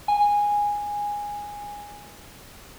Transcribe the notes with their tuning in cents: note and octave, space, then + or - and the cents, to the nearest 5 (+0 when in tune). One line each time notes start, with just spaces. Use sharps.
G#5 -10